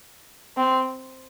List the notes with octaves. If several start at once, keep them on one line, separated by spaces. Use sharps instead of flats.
C4